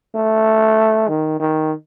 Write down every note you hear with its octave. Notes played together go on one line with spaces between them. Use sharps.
A3
D#3
D#3